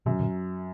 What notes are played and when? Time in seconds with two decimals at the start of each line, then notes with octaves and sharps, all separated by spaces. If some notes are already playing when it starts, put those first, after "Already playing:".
0.06 F#2 B2 D#3
0.20 A#2 D3